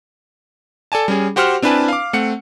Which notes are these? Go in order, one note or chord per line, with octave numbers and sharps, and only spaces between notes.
A4 D5 G#5 A5
G3 C#4 G#4
F#4 G4 C5 F#5 F6
C4 D4 E4 B4 G#5 A5
F5 D6
A3 C4 F#5 C#7